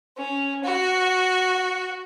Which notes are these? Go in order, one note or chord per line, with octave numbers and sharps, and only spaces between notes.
C#4
F#4